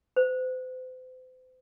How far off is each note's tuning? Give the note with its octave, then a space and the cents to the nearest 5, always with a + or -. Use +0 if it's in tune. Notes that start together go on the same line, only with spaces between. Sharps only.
C5 -40